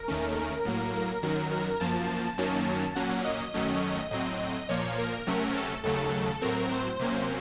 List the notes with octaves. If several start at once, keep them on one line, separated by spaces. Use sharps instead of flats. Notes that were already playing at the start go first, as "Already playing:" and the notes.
Already playing: A#4
D#2 D#3 A3 C#4
A#4
A2 F#3 A#3
A#4
F#2 D#3 F#3
A#4
F#2 F3 A#3 A5
F#2 D#3 F#3 A#3 C#4
A#2 F#3 A#3 C#4 F#5
D#5
F#2 D#3 F#3 A3 C#4
A2 F#3 C4 D#5
A#2 F3 A#3 C#5
A#4
C3 F#3 A3 C#4
A4
D#2 C#3 F#3 A3 A4
A2 F#3 C4 A#4
C5
C3 F#3 A#3 C#4